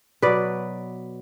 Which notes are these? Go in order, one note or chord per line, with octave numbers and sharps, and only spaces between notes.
B2 F#3 B4 D5